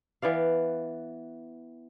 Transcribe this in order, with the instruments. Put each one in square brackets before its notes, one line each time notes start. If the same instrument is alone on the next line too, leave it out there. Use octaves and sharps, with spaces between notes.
[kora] E3 B3 D5 F5